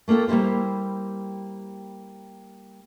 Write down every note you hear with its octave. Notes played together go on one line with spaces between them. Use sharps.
A3 A#3 F4 A4 G5
G3 A#3 E4 G4 C5